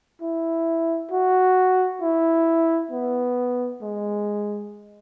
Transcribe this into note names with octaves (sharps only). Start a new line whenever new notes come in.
E4
F#4
E4
B3
G#3